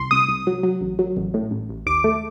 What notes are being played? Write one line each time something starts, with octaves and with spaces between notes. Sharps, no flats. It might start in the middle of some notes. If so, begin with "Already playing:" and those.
Already playing: C2 C6
C2 D#6
C2
F#3
F#3
A1
F#3
A1
A2
A1
A1
D#2 D6
A3